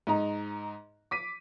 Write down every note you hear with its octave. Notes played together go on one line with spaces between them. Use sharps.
G#2 D#4 A#5
D6 B6 D#7